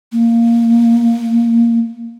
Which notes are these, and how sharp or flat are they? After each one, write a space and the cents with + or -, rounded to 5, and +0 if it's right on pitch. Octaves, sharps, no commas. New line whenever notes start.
A#3 -5